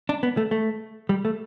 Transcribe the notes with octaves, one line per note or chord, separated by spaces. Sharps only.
D4
B3
A3
A3
G3
A3